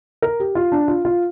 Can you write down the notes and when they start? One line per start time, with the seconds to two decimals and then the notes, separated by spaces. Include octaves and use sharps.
0.22 A#4
0.40 G4
0.55 F4
0.72 D4
0.88 F4
1.05 F4